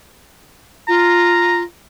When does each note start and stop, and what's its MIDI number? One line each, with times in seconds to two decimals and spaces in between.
0.88 1.62 65
0.88 1.60 82